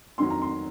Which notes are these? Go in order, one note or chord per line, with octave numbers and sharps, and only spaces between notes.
F2 D#3 F#3 C6
A#5
C6